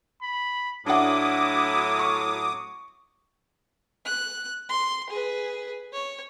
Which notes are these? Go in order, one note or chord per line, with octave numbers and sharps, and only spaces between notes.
B5
A2 F#3 D4 E4 E5 F#5 D6 D#6
C#6
F#6
C6
G#4 B4
C#5